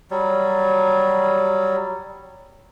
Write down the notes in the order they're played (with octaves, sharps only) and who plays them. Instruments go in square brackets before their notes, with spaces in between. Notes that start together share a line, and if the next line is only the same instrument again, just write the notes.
[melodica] F#3 G3